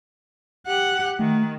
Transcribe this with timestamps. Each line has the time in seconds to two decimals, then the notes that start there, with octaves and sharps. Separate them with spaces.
0.66 G4 F#5
1.19 D#3 A3